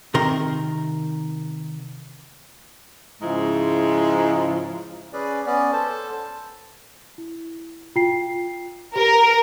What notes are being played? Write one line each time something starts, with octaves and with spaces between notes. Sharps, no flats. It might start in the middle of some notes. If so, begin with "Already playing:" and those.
C3 D#3 A#4 C6
G#2 C#3 F3 G#3 E4
C#4 G#4 B4 D5
B3 C#4 D5
A4 C5 A5
E4
F4 G5 C7
G4 A#4